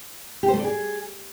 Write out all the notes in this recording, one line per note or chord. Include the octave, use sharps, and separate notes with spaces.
G4
C5
A3
D5
G#4